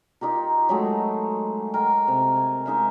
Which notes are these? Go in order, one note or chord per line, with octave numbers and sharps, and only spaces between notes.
D#4 F4 G4 A#4
F#3 G#3 A3
A#4 G5
C3
G#5
G#3 D#4 E5 F5